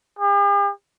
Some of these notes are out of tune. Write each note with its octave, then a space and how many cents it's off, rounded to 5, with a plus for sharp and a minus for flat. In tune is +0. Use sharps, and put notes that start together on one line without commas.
G4 +45